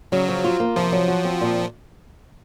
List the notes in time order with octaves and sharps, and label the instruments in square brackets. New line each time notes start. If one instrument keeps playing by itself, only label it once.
[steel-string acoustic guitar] C#3 [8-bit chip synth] F#3
[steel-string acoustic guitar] F3
F4
A#3
[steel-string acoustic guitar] C3 [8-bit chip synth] F3
[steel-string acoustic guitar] F#3
F#4
C4
A#2